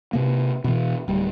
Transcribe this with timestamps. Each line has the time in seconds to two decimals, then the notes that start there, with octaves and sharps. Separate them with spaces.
0.13 C3 A#3
0.64 B2 E3
1.08 D1 G3